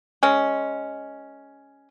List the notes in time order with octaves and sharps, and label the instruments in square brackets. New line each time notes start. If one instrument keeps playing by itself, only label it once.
[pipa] G#3 C#4